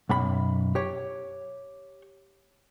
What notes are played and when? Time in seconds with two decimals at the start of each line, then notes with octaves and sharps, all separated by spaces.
0.09 B1 F#2 B5
0.75 G4 C#5